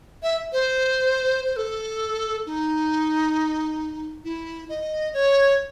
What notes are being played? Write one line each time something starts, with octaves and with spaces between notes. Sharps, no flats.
E5
C5
C5
A4
D#4
E4
D#5
C#5